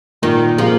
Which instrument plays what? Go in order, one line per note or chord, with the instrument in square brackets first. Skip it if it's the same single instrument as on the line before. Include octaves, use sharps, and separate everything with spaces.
[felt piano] A#2 [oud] D#3
[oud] F3 [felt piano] A#3 F4 G#4